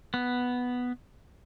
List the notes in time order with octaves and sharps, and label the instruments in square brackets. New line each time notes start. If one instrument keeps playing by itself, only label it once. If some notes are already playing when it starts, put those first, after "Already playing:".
[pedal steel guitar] B3